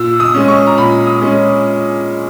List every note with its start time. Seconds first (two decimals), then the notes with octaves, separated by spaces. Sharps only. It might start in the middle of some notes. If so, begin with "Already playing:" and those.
Already playing: A#2 E6
0.20 D#6
0.34 G#3 C#4
0.48 C#6
0.67 A#5
0.78 A#2 B5
1.07 D#6
1.22 G#3 C#4